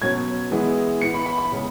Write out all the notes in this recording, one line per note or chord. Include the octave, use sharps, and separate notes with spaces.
B2 F#3 C#4 G#6
E3 G#3 B3
E3 B3 C#7
B5
B5
B5
C#3 G#3 B3